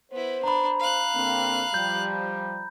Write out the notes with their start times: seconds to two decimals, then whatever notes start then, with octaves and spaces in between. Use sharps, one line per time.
0.12 B3 E4 C5
0.44 D4 A#5 B5
0.79 F5 F#6
1.15 D3 A#3 C4
1.74 F3 G3 G6